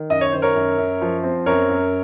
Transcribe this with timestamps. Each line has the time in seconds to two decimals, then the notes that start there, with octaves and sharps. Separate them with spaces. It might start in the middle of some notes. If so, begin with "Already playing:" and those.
Already playing: D#3
0.10 F#2 D#5
0.21 C#5
0.32 D#3 C5
0.42 A#4 C#5
0.55 F#2
0.78 F#2
1.01 F3
1.24 C4
1.46 F#2 A#4 C#5
1.69 F#2